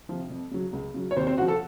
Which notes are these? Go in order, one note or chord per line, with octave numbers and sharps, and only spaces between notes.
C3 F3
F2
C#3 F#3
C#2
C#3 F#3
C#5
D#2 C4 C5
C4 C5
C#3 F3 F#4 F#5
A4 A5